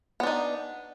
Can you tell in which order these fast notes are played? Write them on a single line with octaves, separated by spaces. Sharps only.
B3 D4 D#4